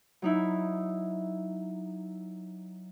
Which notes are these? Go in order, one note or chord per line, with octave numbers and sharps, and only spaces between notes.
F#3 D#4 E4